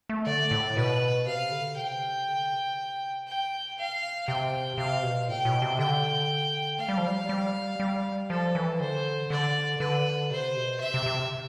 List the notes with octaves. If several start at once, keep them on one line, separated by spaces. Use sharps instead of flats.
A3
D3 D5
A2
B2 B4
C3 F5
D3
C3 G5
D3
C3
G5
B2 F5
C3 G5
C3 F5
B2
A2 G5
B2
C3
D3 G5
A3 F5
G3
F3
G3
G3
G3
F3 A4
E3
D3 C5
D3 D5
D3 B4
C3 C5
B2
C3 E5
C3
C3